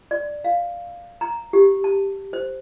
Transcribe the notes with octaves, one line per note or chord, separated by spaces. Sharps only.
D5
F5
A#5
G4
A5
C5